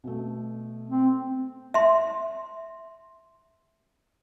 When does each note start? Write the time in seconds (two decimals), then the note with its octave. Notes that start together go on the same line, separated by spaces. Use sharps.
0.04 B2 A3
0.90 C4
1.74 E5 C6